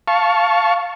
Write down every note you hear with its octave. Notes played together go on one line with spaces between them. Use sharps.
F5 A5 C#6